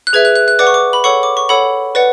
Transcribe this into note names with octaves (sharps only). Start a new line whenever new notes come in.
F#6
G#4 B4 E5 G#6
F#6
F#6
F#6
B4 D5 F#5 D6
C#6
D6
B5
A4 C#5 F#5 C#6
D6
C#6
A4 C#5 F#5 B5
B4 D5 F#5